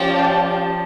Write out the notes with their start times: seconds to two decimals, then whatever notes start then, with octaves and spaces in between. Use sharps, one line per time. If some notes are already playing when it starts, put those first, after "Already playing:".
Already playing: F3 C#4 G4 D5 F5 A5